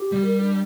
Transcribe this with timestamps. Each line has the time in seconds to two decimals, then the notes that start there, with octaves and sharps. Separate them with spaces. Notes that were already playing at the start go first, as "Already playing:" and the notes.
Already playing: G4
0.12 G3
0.25 A#4
0.42 D4